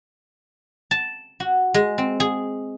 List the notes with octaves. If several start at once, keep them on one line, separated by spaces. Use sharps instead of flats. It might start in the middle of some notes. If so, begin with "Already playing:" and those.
A5
F#4
G#3
C4
G#4